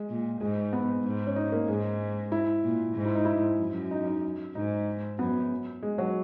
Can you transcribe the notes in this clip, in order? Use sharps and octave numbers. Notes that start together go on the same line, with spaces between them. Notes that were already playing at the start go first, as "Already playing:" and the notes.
Already playing: G#3
A#2
G#2 G#3
B3
G#2
C#4
D#4
A#3
G#2 G#3
E4
A#2
G#2
E4
D#4
E4
F#2
D#4
D#4
G#2 D#4
F#2 B3
G#3
F#3